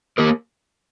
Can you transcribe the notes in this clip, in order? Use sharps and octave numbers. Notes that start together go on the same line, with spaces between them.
A#3 G4 A#4